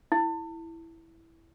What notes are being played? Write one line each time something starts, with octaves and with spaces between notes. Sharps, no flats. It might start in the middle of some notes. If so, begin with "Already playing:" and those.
E4